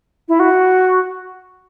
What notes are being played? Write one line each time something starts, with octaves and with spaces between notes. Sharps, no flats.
E4
F#4